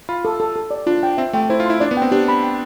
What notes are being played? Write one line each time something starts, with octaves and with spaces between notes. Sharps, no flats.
F4 B5
A4
A4
A4
D5
D4 F4
G5
C4 E5
A3 G5
E4 C5
F4
E4 C6
D4 D5
B3
C4 G5
D4 G4
B5
G5